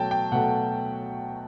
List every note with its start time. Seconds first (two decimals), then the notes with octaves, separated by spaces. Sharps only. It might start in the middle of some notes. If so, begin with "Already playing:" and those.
Already playing: B2 F#3 A3 G5 A5
0.11 G5
0.32 B2 F#3 A3 F#5